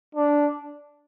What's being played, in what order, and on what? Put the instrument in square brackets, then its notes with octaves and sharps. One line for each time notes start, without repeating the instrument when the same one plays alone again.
[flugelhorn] D4